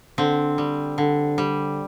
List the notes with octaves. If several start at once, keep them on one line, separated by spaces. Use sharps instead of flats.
D3 C4
G3
D3
G3